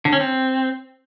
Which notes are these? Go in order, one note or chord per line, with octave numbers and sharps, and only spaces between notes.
D3
C#4
C4